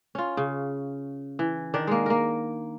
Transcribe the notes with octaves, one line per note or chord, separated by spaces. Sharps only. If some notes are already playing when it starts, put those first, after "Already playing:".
C#4 F4
C#3
E3
D#3 D4 D5
G#3 A#3
A#3 A#4